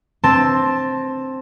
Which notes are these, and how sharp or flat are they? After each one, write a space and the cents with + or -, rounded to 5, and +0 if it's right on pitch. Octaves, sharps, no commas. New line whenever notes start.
C4 +10 A5 +0